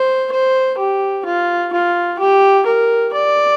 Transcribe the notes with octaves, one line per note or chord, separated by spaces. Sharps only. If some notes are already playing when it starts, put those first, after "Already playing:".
Already playing: C5
C5
G4
F4
F4
G4
A#4
D5